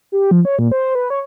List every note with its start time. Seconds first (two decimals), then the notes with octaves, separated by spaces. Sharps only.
0.12 G4
0.31 F3
0.45 C#5
0.59 A#2
0.72 C5
0.95 B4
1.10 C#5